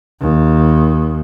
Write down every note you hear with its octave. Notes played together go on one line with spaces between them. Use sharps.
D#2